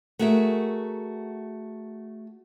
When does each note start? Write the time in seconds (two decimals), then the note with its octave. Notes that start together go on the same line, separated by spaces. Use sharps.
0.19 A3 F#4 G#4 A#4 E5